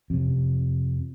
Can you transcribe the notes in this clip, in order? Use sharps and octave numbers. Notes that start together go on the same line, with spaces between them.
F2 C3